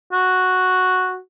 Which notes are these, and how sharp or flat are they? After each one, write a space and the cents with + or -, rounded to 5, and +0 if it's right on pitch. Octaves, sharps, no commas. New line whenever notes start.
F#4 -5